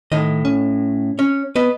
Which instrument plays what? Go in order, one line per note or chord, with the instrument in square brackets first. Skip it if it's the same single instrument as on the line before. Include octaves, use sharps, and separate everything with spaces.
[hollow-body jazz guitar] A2 D#5 [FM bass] D#3
[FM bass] C#4
[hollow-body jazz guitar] C#4
[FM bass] B3 [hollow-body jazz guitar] B4 D#5